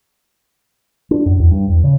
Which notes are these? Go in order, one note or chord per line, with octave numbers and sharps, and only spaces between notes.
D4
F#2
E2
G2
E2
C#3